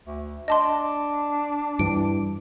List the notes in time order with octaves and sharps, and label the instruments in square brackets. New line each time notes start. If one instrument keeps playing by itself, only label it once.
[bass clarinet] D2
[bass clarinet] D4 [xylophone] D#5 A5 C6
[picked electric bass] G2 E3 [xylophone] D7